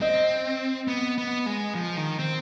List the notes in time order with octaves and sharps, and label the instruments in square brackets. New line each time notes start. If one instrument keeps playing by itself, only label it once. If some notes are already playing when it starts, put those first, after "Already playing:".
[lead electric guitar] C4 [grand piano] D#5
[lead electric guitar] B3
B3
G#3
F3
D#3
C4